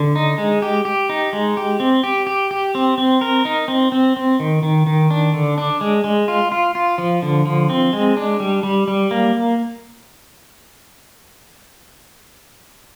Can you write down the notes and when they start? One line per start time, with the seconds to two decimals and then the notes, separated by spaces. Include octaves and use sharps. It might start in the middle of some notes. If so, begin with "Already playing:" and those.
Already playing: D3
0.16 D#4
0.38 G#3
0.62 G4
0.85 G4
1.09 D#4
1.33 G#3
1.57 G4
1.80 C4
2.04 G4
2.27 G4
2.51 G4
2.75 C4
2.98 C4
3.21 A#4
3.45 D#4
3.68 C4
3.92 C4
4.16 C4
4.40 D#3
4.63 D#3
4.87 D#3
5.10 D4
5.34 D3
5.58 D4
5.81 G#3
6.04 G#3
6.28 F4
6.52 F4
6.75 F4
6.98 F3
7.22 D3
7.46 F3
7.70 C4
7.93 G#3
8.17 D4
8.40 G3
8.63 G3
8.88 G3
9.11 A#3